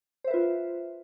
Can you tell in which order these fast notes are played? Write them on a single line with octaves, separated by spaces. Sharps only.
C5 E5 B4 F4